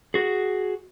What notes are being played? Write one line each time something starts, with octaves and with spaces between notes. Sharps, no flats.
F#4 G#4